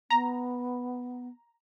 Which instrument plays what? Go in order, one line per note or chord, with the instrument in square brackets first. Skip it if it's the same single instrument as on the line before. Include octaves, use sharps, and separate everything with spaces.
[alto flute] B3 [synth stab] A#5